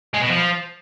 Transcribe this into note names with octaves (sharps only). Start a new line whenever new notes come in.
G#3
B2
F3